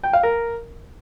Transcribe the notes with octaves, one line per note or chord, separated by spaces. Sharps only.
G5
F5
A#4